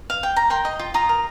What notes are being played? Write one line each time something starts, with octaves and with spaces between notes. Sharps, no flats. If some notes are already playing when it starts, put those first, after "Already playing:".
F5
G5
A#5
A#4 G5 C6
D#5
F4
F4 A#5 D#6
A#4